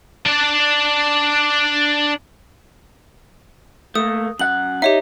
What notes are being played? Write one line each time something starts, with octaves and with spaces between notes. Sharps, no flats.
D4 D5
A3 A#3 D#6
F#2 F#5 F#7
D#4 G4 C#5 E5